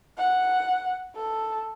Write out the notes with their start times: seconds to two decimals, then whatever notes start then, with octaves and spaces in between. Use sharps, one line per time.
0.18 F#5
1.16 A4